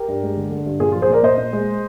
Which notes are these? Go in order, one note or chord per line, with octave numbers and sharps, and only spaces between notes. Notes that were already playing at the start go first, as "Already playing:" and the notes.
Already playing: G4 A#4
G2
G#3
D3
D3
G2
A#2 F4 G#4
F4
F3
G#4 C5
A#2 A#4 D5
A#2 C5 D#5
A#2
G#3